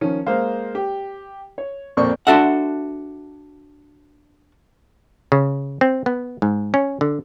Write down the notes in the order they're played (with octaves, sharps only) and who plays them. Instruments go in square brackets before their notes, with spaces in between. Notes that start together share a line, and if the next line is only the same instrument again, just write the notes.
[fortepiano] D#3 F3 C#4
G#3 A#3 C5 F5
G4
C#5
F2 A#2 A#3 C4 D5 C#6
[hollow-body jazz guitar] D4 F#4 A4 E5 F#5
[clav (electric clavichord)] C#3
C4
B3
G#2
C#4
D3